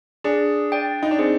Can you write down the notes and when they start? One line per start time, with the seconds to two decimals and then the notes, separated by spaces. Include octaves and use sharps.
0.24 D4 G#4
0.72 D5 G5
1.03 D#4
1.11 D4
1.19 C4 G#4